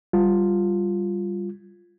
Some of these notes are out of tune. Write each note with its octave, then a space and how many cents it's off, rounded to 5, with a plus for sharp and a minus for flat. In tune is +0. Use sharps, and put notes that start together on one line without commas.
G3 +0 F4 +0